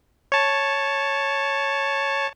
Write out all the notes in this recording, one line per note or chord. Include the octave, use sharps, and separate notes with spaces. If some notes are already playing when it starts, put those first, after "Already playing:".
C#5 A5